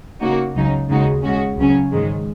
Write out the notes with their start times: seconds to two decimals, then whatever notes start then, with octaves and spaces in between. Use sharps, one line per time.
0.20 C#3 A#3 D#4 F#4
0.54 C#2 C#3 F#3 D#4
0.89 D#2 C#3 G#3 D#4 F#4
1.23 C#3 G#3 C#4 F#4
1.58 C#2 C#3 F#3 C#4
1.92 G#2 D#3 G#3